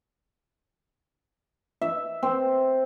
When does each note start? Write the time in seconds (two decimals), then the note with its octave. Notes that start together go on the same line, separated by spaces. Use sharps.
1.81 E5
2.23 C4